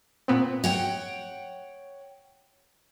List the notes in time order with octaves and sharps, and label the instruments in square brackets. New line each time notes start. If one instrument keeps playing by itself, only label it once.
[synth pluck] A#2 B3 C4
[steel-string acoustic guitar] C#5 F#5 G5